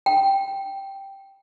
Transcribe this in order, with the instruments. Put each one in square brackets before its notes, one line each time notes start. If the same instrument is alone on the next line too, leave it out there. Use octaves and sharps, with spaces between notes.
[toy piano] G5